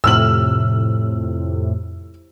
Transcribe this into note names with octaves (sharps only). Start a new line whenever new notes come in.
F2 A2 C3 E6 F6 F#7